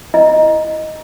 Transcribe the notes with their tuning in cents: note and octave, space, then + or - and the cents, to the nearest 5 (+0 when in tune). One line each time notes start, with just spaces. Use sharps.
E4 +0 D#5 +0